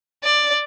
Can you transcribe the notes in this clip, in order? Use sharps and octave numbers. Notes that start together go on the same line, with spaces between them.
D5